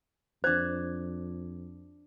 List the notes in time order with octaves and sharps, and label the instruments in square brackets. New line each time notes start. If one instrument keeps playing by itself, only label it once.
[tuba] F2 [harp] D4 G#6 [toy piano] C5